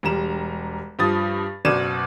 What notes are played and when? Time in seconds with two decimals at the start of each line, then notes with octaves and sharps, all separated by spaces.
0.03 E1 G3 A#5 E7
0.99 G2 F3 D#6 A6
1.65 F#1 B2 D5 G#6 D#7 E7